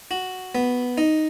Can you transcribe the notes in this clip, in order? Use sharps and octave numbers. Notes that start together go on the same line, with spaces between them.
F#4
B3
D#4